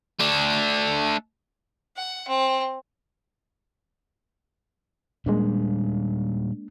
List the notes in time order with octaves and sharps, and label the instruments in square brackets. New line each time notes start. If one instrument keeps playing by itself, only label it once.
[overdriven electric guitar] A3 D4
[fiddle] F#5
C4
[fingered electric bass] A#2 G3 [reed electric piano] G#3 A#3 D4